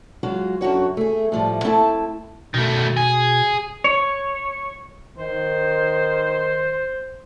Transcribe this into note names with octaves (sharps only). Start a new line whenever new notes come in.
F#3 G#3 F4 F#4
F#2 D3 F#4 C#5
A3 G#4
A2 F3 G3
A3 C4 E4 A4 G5 A5
B2 D#3 A3
G#4
C#5
D#3 C5